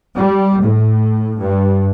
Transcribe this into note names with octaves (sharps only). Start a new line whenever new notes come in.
G3
A2
G2